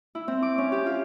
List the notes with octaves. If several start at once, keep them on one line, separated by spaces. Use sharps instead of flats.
E4
C4
D6
C#4
G4
F4